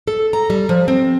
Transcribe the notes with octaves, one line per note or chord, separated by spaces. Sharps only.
A4
A#5
G3
F3
C4